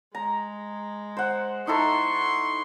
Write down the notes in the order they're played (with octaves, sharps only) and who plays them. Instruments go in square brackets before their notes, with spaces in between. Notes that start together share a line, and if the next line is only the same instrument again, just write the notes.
[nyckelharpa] G#3 [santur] A#5
[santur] C5 F#5
[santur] D#4 E4 A4 [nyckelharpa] C6 C#6